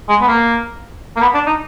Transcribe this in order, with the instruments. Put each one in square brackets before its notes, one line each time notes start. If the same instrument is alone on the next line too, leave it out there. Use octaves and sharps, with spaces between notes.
[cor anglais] G#3
B3
A#3
A#3
B3
D4
D#4